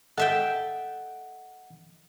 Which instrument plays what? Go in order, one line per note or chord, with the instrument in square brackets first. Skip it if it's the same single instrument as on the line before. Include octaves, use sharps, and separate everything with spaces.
[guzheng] A4 E5 G5 [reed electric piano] D#5 F#5 F#6